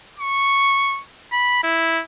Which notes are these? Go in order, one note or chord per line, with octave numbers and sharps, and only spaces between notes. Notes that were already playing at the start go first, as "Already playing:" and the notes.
C#6
B5
E4